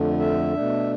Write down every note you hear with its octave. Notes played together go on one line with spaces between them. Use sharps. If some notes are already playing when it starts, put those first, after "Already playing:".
Already playing: F2 D3 A3
E5
B2 A3 D4